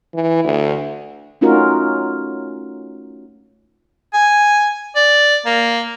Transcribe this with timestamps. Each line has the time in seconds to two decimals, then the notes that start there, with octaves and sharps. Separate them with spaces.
0.14 E3
0.44 D2
1.41 A3 C#4 D#4 F4 F#4 A#4
4.14 G#5
4.96 D5
5.45 A#3